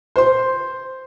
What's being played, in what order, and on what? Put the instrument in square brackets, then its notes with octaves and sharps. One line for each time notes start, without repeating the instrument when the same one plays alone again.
[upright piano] C5 C6